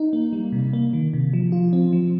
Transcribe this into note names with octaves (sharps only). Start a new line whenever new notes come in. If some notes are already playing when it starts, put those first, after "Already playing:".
Already playing: D#4
A#3
G3
C3
A#3
D#3
C3
F3
F4
C4
F3